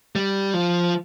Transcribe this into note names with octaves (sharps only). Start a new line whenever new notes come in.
G3
F3